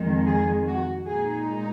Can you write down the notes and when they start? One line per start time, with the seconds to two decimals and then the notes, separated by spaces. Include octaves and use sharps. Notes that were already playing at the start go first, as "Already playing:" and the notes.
Already playing: F2 D#3 G#3
0.26 G#4
0.67 F#4
1.05 A#2 G#3 D#4 G#4